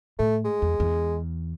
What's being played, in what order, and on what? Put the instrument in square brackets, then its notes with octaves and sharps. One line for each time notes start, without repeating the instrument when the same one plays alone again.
[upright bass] A2 [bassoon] A3
[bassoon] G#3
[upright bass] E2
E2